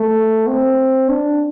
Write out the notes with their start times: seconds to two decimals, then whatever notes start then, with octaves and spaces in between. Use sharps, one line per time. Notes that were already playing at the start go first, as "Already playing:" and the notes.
Already playing: A3
0.47 C4
1.09 D4